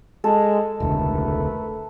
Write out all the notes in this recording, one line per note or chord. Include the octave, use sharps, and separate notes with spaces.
G#3 A4
E1 C#2 D3 A3 A#4 B4